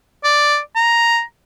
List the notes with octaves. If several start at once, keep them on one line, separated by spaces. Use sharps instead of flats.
D5
A#5